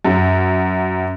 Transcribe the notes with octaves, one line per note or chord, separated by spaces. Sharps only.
F#2